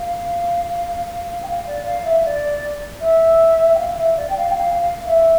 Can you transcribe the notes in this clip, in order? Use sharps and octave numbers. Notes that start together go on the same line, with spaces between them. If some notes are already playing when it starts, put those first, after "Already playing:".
Already playing: F5
G5
F5
D5
F5
E5
D5
E5
G5
F5
E5
D5
G5
F5
G5
F5
F5
F5
E5